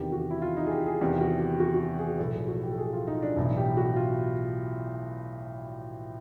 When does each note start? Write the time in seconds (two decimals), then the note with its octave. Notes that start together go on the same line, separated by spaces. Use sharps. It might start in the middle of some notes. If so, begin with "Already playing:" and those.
Already playing: E2 C3 D#3 G4
0.12 F#4
0.31 E4
0.42 F4
0.57 D#4
0.67 G#4
0.72 G4
0.86 G#4
1.01 E2 C3 D#3 G4
1.21 F#4
1.40 G4
1.60 F#4
1.74 F#4
1.80 G4
1.99 G#4
2.19 B1 A2 F3 A4
2.34 G#4
2.48 F#4
2.63 G4
2.71 A4
2.78 G#4
2.93 F4
3.07 D#4
3.22 D4
3.37 B1 A2 E3
3.57 G4
3.77 F#4
3.96 F4